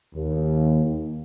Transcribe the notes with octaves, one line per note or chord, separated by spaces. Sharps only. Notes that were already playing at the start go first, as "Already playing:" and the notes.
D#2